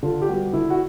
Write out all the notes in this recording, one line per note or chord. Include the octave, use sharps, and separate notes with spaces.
D3 F4
G4
G3 B3 F#4
D3 E4
F#4